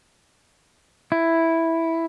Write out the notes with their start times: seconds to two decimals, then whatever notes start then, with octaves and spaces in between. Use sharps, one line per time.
1.12 E4